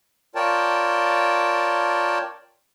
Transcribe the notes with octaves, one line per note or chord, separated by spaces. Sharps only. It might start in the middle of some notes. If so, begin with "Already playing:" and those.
F4 A#4 C#5 D5 G5 A5